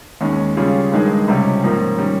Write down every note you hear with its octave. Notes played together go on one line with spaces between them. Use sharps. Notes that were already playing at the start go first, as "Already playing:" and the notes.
D#2 D#3 G#3 C#4
C#3 G3 C#4 F4 G#4
G2 D#3 G#3 D#4 G#4
C#2 C3 G3 C#4
G#2 F3 A#3 C#4
D#3 G3 C#4